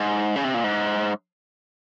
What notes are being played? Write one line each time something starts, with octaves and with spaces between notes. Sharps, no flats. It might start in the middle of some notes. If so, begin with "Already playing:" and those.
Already playing: G#2
C#3
C3
A#2
G#2